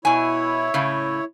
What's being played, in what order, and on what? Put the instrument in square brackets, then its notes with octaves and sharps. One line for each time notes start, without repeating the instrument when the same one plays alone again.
[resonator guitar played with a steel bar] B2 G#5 [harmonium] E4 C#5
[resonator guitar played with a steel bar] A2 C#3